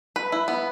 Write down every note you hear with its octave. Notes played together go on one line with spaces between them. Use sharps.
B4
E4
B3